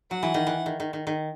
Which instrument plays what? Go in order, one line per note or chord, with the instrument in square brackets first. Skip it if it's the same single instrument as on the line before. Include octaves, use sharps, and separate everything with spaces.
[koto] F#3 [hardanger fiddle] F#5
[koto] E3
D#3
E3
D#3
D#3
D#3
D#3